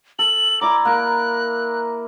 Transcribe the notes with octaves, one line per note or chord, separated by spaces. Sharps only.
A4 F#7
E4 D5 A#5 D6
A#3 A#4 F#6